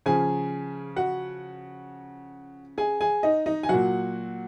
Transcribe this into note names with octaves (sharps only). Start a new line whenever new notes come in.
C#3 F3 G#4 G#5
F#4 F#5
G#4 G#5
G#4 G#5
D#4 D#5
D#4 D#5
G#5
A#2 F#3 F#4 F#5